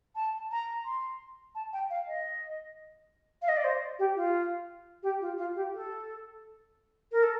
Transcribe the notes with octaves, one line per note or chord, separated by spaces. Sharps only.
A5
A#5
C6
A5
G5
F5
D#5
F5
D#5
D5
C5
G4
F4
G4
F4
F4
G4
A4
A#4
A4